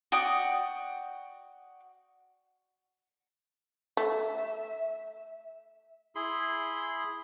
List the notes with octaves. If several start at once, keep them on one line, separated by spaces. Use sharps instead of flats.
F#4 D5 G5 D#6
A3 E5
E4 G#4 B5 C6